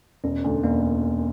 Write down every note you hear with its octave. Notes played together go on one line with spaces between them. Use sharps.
E1 C#4
D2 D3
E1 A#3